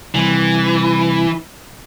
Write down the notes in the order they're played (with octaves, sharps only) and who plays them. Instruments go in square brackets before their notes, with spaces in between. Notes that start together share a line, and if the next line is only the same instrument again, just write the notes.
[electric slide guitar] C3 G3 C4 [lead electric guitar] E3